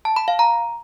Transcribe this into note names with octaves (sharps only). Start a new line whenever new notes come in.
A5
B5
F5
A#5